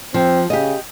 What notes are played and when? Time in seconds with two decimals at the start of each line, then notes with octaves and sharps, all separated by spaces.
0.14 F3 C4
0.50 C#3 G4 D#5